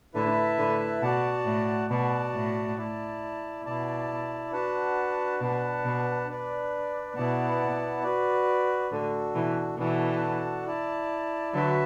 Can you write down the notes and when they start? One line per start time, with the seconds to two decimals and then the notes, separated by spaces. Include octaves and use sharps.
0.14 A2 D3 E4 B4 E5 A5
0.58 A2 D3
1.02 B2 F#4 D5 F#5 A5
1.46 A2
1.90 B2 F#4 D5 F#5 A5
2.34 A2
2.77 E4 D5 A5
3.65 B2 E4 D5 A5
4.52 D4 F#4 B4 F#5 A5
5.40 B2 D4 B4 F#5 A5
5.84 B2
6.28 D4 B4 D5
7.16 B2 B3 E4 D5 F#5 A5
8.03 F#4 B4 D5
8.91 A2 D3 D4 F#4 A4
9.34 B2 E3
9.78 B2 E3 D4 F#4 A4 F#5 A5
10.66 E4 D5 A5
11.53 D3 F#3 F#4 B4 E5 A5